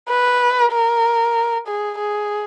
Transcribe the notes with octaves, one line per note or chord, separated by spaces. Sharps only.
B4
A#4
G#4
G#4